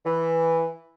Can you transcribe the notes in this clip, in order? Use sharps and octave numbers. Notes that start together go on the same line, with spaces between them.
E3